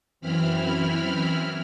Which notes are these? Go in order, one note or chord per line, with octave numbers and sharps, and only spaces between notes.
F#2 E3 C4 E4 B5 F6